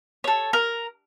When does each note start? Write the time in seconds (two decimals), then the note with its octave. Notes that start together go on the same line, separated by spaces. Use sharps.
0.24 A4 C#5
0.53 A#4